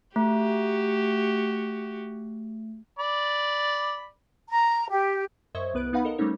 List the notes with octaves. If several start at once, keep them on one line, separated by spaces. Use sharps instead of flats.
A3 F#4 G4
D5 B5
A#5
G4
F#2 C5 D#5 E5 C#6 G#6
C2 B3 B4 F#6 D7
B3 D#4 B4 F5 F#5 B5
A4 A#4 D#5
G3 A3 C4 C#4 D#4 C#5